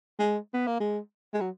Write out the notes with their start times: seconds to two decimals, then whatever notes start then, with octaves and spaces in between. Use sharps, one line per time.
0.19 G#3
0.54 B3
0.67 A#3
0.80 G#3
1.34 G#3
1.41 F#3